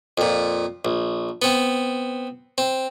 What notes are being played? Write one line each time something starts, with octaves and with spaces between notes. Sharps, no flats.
F2 A#2
A#1
B3 C4
C4